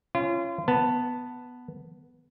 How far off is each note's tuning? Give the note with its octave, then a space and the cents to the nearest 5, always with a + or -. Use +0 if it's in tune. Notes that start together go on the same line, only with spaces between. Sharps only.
C#4 -5 F4 -35
B3 +0 A5 +10